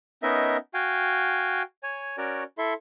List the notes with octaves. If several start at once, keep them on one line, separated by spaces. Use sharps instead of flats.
B3 C#4 D#4 A#4 D#5 E5
F#4 F5 G5 G#5
C#5 G#5
C#4 F#4 A#4 C#5 D5
E4 A4 E5 C6